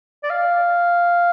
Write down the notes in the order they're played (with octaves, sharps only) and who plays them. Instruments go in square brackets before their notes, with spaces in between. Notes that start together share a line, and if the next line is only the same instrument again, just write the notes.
[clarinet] D5
F5